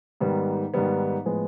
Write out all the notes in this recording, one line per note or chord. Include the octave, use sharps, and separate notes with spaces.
G#2 D#3 G3 B3
G#2 D#3 G3 B3
A2 F3 G#3 B3